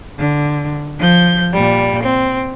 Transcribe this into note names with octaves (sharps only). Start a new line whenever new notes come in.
D3
F3 G6
A#2 G3
C4